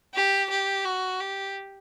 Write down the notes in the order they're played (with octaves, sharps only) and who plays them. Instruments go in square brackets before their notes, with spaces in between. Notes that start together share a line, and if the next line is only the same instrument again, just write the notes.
[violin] G4
G4
F#4
G4